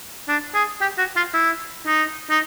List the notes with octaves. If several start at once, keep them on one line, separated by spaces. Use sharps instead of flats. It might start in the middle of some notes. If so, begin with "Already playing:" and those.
D4
G#4
G4
F#4
F4
E4
D#4
D#4